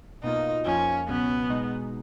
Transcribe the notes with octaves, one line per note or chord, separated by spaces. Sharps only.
B2 A#3 D#4 F4
F2 F3 A#3 C#4 F4
C#2 B2 F#3 B3 C#4
B2 G#3 D#4